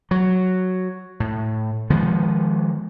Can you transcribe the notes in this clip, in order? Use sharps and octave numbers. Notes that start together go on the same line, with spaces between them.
F#3
A2
D#3 F3 G#3 B3